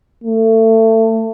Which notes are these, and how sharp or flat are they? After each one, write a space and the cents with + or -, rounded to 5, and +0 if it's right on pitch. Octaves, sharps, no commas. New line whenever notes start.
A3 +25